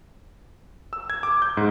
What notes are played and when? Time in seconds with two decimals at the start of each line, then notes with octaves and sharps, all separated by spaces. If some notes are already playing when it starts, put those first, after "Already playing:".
0.93 E6
1.10 G#6
1.23 D6
1.42 G6
1.57 G#2